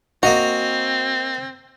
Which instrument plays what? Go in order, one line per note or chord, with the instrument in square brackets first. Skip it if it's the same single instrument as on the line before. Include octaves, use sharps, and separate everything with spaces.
[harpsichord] A#3 D#5 A#5 [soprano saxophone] C4 [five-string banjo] F#4